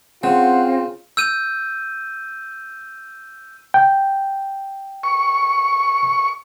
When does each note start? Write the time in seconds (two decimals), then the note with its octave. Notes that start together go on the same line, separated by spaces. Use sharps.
0.24 C#3 C4 F4 F#5
1.17 E6 G6 D#7
3.74 G5
5.03 C#6